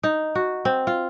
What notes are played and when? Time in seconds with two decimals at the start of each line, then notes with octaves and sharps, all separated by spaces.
0.03 D#4
0.35 F#4
0.65 C4
0.87 F4